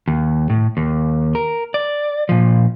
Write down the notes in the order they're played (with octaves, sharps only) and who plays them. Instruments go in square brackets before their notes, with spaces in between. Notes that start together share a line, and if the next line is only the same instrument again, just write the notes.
[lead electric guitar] D#2
A2
D#2
A#4
D5
A#2 F3